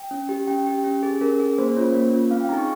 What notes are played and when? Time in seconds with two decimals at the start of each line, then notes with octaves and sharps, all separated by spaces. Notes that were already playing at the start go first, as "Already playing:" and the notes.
Already playing: G5
0.11 C#4
0.29 G4
0.48 C#4 G5
0.67 G4
0.84 C#4
1.03 G#4
1.21 C#4 A#4
1.40 G#4
1.58 A#3 C5
1.76 C#4 F4 C#5
1.94 A#3
2.13 C#4 F4
2.31 C4 F5
2.41 G5
2.49 D#4 G#4 A#5
2.58 C#6